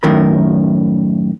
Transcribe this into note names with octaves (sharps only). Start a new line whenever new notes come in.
F#2 A2 D#3 A#4 B5